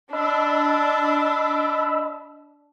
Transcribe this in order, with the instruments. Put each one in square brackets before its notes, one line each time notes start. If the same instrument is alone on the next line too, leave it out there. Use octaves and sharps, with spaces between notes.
[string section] D4 [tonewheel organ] D#5 B5 E6